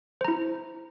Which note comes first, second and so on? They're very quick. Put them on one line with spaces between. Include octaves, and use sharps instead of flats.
C5 A#5 E4